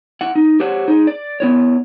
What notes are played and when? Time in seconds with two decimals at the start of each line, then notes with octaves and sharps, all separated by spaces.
0.21 E4 F#5
0.35 D#4
0.60 G4 C5 C#5 F#5
0.88 D#4 G#4
1.07 D5
1.40 B3 E4 C#5